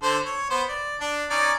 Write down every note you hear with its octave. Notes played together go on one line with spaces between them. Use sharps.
D3 A4 C5
C#5
B3 C5
D5
D4
C#4 D#4 D5